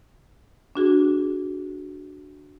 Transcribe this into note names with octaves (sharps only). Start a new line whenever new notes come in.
D4 F#4 G#4